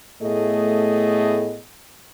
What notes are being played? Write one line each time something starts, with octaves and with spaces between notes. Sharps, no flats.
A2 A3 B3 G#4 D#5